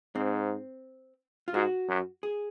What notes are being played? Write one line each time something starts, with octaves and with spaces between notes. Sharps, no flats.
G#2 C4
F4
G#2 F#4
F#2
G#4